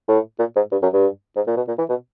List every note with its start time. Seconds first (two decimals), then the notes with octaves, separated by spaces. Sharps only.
0.08 A2
0.39 A#2
0.56 G#2
0.72 G2
0.82 F#2
0.93 G2
1.36 G#2
1.47 A#2
1.57 B2
1.68 A#2
1.78 E3
1.89 B2